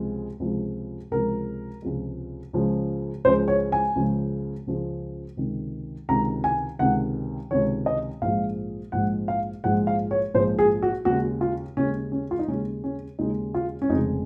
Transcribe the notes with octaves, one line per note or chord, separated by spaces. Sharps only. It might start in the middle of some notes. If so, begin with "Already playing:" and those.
Already playing: C#2 C3 F3 G#3
C#2 C3 F3 G#3
C#2 C3 F3 G#3 A#4
C#2 C3 F3 G#3
C#2 C#3 F3 G#3
C#2 C#3 F3 G#3 C5
C#5
G#5
C#2 C#3 F3 G#3
C#2 C#3 F3 G#3
C#2 C3 D#3
C#2 C3 D#3 A#5
G#5
C#2 C3 D#3 F#5
C#2 C3 D#3 C#5
D#5
A#1 G#2 F3 G#3 F5
A#1 G#2 F3 G#3 F#5
F5
A#1 G#2 F3 G#3 F#5
F5
C#5
A#1 G#2 F3 G#3 C5
G#4
F#4
D#2 C#3 G#3 F#4
F4
D#2 C#3 G#3 C#4
C#4
F4
D#4
D#2 C#3 G#3 C#4
C#4
D#2 C#3 G#3 D#4
F4
C#4
F1 F2 C#3 G#3 D#4